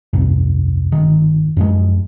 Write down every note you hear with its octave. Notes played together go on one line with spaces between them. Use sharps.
F1 C2 G2
G1 D#3
F#2 F3 G#3